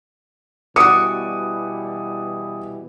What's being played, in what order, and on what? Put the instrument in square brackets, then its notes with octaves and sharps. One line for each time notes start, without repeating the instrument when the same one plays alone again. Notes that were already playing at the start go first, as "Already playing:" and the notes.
[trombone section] B2 E3 G3 [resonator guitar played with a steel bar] F#4 D5 [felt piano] D#6 C#7